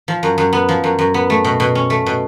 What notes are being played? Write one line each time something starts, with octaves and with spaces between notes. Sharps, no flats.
F3
F#2
F#2
B3
F3
F#2
F#2
B3
A3
B2
B2
C#4
A3
B2